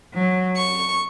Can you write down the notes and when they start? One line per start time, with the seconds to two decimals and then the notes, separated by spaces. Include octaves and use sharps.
0.12 F#3
0.57 C#6